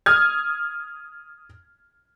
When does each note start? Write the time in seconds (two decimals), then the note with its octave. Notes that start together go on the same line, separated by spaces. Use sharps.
0.06 D#6 F6 G#6